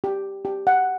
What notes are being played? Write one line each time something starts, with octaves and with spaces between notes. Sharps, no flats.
G4
G4
F#5